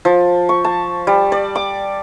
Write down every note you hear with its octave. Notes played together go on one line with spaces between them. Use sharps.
F3
C#6
A5
G3
D5
D6